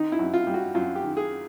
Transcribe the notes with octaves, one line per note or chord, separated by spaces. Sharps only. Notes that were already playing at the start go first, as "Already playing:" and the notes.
Already playing: D#3 D#4
E4
F#2
F4
G3
F#4
F#2 F4
G4
D#3
G#4